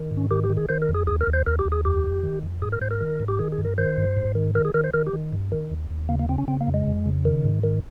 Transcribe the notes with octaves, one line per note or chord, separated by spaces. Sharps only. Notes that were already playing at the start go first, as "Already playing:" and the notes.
Already playing: D#3
G#2
C#4
D#3 G4
G4
D#3
G#4
D#3 C5
A#4
F2
G#4
D#2 G#4
A#4
D#2
C5
D#2 A#4
G4
D#2
G#4
F2 G4
F2
D#3
F2
G#2 G#4
A#4
G#2 C5
A#4
D#3
G#2
G4
D#3 G#4
G#4
G2
A#4
D#3 C5
G2
G#2
D#3
D#3 A#4
G#4
D#3 A#4
C5
D#3 A#4
G4
D#3
G2
D#3
D#2
D#2
C#3 A#3
A#3
C#3 C4
C#4
C#3 C4
A#3
F2
G#3
F2
C#3
D#3
G#2
D#3